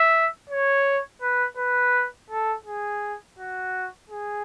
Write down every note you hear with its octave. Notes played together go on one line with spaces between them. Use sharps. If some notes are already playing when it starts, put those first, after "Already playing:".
Already playing: E5
C#5
B4
B4
A4
G#4
F#4
G#4